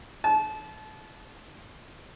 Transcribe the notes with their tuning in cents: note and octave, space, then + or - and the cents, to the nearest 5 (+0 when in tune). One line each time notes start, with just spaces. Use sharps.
A5 -30